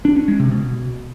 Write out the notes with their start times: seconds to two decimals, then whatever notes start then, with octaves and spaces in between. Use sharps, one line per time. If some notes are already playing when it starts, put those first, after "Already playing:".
0.05 D4
0.16 C#4
0.28 G#3
0.40 C3
0.51 B2